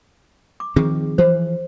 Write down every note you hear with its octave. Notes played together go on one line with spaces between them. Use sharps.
D6
D#3 F3 C4 G#4
E3 F3 C5